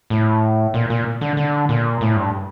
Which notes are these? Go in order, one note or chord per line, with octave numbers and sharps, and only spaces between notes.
A2
A#2
A#2
D3
D3
A#2
A2
G2